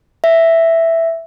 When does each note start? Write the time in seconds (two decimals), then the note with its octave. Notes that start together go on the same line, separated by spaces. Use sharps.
0.24 E5